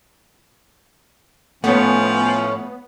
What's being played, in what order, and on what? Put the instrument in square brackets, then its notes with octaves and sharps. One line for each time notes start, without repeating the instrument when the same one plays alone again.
[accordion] A2 C#4 [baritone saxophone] F3 [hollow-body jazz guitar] A3 C#5 [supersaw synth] B3